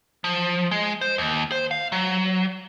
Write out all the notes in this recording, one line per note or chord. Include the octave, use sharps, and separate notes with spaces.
F3
G#3
C5
D#2
C5
F5
F#3